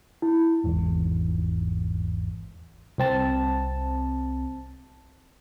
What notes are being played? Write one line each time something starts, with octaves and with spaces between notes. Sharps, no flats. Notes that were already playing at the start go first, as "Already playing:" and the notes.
E4
G#1 E2 G#2
C2 C4 A5